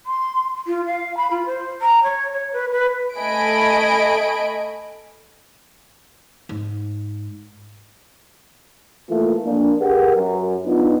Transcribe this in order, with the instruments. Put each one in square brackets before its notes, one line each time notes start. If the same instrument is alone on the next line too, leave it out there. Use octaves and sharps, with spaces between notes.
[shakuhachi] C6
F4
F5
B5
F4
C5
A#5
C#5
C#5
B4
B4
[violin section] A3 D#5 G#5 B5 D7
[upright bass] G#2
[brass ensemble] A2 E3 A3 A#3 F4
F2 A#2 A#3 D4
G4 G#4 A#4 B4 F#5
F#2
B3 D4 D#4 F4